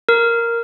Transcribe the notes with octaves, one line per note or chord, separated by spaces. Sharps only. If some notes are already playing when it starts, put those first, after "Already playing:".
A#4